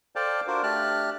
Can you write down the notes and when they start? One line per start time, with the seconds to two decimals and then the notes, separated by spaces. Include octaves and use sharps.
0.16 A4 C5 D5 F5 G5 A5
0.47 D4 F4 F#4 A#4 C5
0.63 A3 D4 G4 A5 F6 F#6